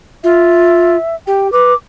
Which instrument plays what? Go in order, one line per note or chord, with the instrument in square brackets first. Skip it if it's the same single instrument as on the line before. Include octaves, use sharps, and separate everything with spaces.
[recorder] F4 [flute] E5
[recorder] G4 [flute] G5
[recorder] B4 [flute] D6